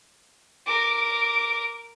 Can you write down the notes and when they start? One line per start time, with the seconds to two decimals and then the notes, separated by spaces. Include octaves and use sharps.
0.67 A#4 D6